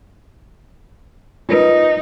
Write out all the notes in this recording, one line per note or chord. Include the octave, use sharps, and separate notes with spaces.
D#4 F4 A#4 B4